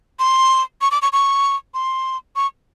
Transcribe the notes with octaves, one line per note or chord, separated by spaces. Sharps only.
C6
C#6
D6
C#6
C#6
C6
C#6